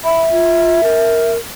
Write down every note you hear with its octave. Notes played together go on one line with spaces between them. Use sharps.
E5 B5
F4
A#4